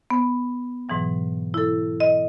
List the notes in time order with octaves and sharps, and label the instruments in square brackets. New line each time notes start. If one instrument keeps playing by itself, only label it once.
[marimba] B3
G#2 B2 E3 F#3
E4 A4
D#5